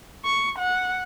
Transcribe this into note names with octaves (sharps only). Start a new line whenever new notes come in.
C#6
F#5